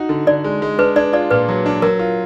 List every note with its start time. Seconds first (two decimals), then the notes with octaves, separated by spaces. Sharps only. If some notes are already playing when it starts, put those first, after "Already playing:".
Already playing: D#4 F#4
0.09 D3
0.27 D3 D5
0.44 G#3
0.62 G#3
0.79 D4 B4
0.96 D4 D5
1.13 F4 D5
1.31 A#2 B4
1.48 F#3
1.66 D4
1.82 F#3 A#4
1.99 F4